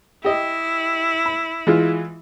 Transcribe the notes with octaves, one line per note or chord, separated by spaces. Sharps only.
E4 G4 D#5
B5
E3 G#3 F4